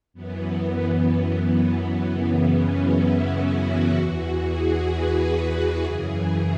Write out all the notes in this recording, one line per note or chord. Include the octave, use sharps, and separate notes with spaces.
F#2 E3 B3
B3
F#2 C#3 E3 B3
C#4
E4
F#4
E2 E3 F#4
G#4
B4
G#4
F#2 C#3 E3